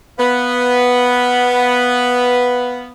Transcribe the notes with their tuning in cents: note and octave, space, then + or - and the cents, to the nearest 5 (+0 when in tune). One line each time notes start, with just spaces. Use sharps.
B3 +0 B4 +0 F5 +0